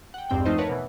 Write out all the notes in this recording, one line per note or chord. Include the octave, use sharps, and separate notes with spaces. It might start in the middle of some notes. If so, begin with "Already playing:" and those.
F#5 G5
G#1 E2 G2 C4 G5
F3 A3 D#4 F4 C5 D#5
A#4 B4 C#5 F#5 A5
B2 E3